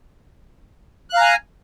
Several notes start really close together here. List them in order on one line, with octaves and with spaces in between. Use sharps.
F#6 F5 A#5 G#5